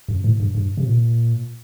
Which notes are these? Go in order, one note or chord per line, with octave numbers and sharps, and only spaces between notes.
F#2
A2
G2
G2
C3
A#2